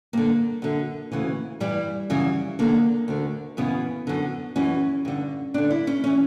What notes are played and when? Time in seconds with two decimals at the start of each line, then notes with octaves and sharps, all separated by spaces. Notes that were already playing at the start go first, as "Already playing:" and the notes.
0.13 G2 D3 A#3
0.62 F#2 D3
1.12 D2 C#3 E3
1.60 G2 E3 G3
2.10 F#2 C#3 E3
2.59 E2 D3 A#3
3.08 D2 D3
3.57 F#2 C#3 E3 B3
4.07 F#2 D3
4.56 F#2 E3 C#4
5.05 G2 D3
5.54 G2 D3 D4
5.71 E4
5.87 C#4
6.04 E3 C#4